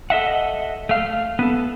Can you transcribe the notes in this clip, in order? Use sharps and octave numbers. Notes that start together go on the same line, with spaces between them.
A4 D#5 E5 F#5
A3 F5
B3 A4